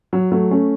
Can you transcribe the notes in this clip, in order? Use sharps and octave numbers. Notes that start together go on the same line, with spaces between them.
F#3
F#3 A3
A3 C#4